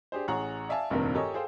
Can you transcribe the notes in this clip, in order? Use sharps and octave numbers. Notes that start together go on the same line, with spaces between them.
D4 G4 G#4 C5
A1 G#4 C#5 F#5 A#5
D5 E5 F5 G#5 A5
F1 A#1 G2 D#3 C4 A#4
G4 A4 A#4 C#5 D#5 G#5
G#4 A4 C5 F5 G5